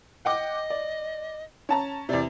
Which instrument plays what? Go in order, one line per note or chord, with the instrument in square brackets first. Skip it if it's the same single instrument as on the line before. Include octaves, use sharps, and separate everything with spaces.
[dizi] D#5 [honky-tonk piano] F#5 G5 D6
[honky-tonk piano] D5
C#4 A5 A#5
[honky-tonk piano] E2 C3 [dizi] D5